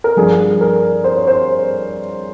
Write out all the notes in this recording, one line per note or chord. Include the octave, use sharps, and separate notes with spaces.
A#4
G2 F3 G#4
A#4
C5
C#5
C5